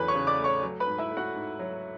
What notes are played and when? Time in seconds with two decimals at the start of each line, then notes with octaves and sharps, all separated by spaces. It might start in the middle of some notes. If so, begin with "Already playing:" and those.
Already playing: E2 C#3 F#3 A3 B4 B5
0.08 C#5 C#6
0.15 C#3
0.27 D5 D6
0.39 A3
0.44 C#5 C#6
0.63 F#3
0.80 B4 B5
0.87 G#2
0.98 E4 E5
1.11 A3
1.17 F#4 F#5
1.35 G#2
1.59 F#3